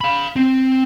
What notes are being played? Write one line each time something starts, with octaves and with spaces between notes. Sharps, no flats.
F5 B5
C4